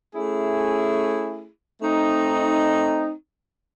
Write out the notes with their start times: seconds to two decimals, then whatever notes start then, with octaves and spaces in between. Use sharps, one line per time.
0.15 A3 C#4 E4 G#4
1.80 A3 C4 D#4